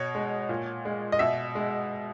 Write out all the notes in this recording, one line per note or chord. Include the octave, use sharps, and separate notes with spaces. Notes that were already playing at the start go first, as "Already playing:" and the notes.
Already playing: B2 C#5
G#3
A#2
G#3
D#5
B2 E5
G#3